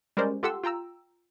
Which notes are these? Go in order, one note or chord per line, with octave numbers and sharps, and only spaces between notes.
G3 G#3 C#4 A#4 C5 D5
F4 G4 A4 F#5 C6 E6
F4 G5 A#5 E6